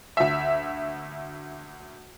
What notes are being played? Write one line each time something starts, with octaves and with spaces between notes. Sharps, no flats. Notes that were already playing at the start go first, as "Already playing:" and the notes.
D2 E5